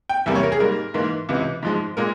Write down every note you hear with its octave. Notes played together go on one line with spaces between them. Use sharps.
G5
E2 C3 G3 A#3 E5
C#5
A#4
G#4
G#2 G3 A#3 A#4
G#2 E3 A#3
C#2 C3 E3
G#2 F3 G#3
A#2 G#3 A#4